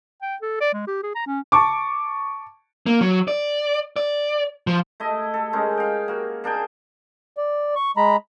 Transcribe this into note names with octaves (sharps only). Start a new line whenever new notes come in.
G5
A4
D5
G#3
G4
G#4
A#5
C#4
A5 C#6 D6
A#3
F#3
D5
D5
F3
A3 E4 D#5
A4
G#3 C#4 D#4 A#4
F5 G5
A#3 F#4
A#3 D4 G#4 G5
D5
C#6
G#3 A#5 B5